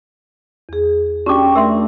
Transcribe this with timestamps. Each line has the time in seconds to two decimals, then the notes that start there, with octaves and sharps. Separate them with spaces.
0.69 E2 G#4
1.26 C#4 D4 F#4 G4 C#6 D6
1.55 A3 A#4 E5 C6